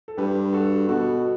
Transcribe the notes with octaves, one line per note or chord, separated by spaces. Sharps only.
A4
G2 G4 B4
F#4 A4
B2 F#4 A4